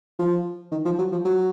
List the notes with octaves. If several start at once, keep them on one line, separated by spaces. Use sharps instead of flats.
F3
D#3
F3
F#3
F3
F#3